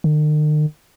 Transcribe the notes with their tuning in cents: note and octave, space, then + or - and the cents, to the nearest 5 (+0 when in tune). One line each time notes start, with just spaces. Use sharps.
D#3 -45